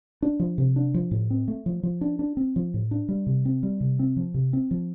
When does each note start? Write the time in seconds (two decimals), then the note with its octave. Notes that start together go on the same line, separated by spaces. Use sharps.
0.22 D4
0.40 F3
0.58 C3
0.76 D4
0.94 F3
1.11 A2
1.30 C4
1.48 A3
1.66 F3
1.83 F3
2.01 D4
2.19 D4
2.37 C4
2.56 F3
2.74 A2
2.91 D4
3.09 G3
3.26 C3
3.45 C4
3.63 G3
3.81 C3
3.99 C4
4.17 F3
4.34 C3
4.53 C4
4.71 F3